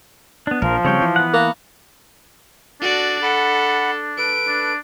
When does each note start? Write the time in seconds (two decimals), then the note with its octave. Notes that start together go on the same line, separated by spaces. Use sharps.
0.47 B3 D4
0.62 A#1 F3 A#4
0.85 C#3 G3 C4 C#5 G5
1.02 E3
1.16 B3 F#5
1.34 A#3
2.81 D4 F#4 A4 D5
3.22 A4 F#5 B5
4.18 A4 B4 D7
4.47 D4